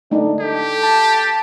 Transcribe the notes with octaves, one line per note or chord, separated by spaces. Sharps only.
A3 D4 D#4
G4 A4
A5